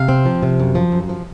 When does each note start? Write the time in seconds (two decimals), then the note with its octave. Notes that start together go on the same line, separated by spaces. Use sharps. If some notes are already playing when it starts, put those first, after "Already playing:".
Already playing: C3 F5
0.09 C4
0.25 F3
0.43 C3
0.60 F#2
0.75 F3
0.92 F#2
1.09 F3